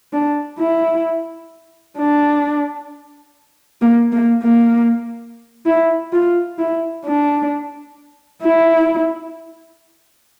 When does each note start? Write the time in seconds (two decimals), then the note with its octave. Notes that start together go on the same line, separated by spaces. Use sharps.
0.13 D4
0.58 E4
1.97 D4
3.82 A#3
4.12 A#3
4.43 A#3
5.66 E4
6.13 F4
6.58 E4
7.05 D4
8.43 E4